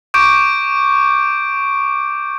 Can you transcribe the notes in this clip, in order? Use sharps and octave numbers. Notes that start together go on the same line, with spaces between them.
C#6 D6 G6 D7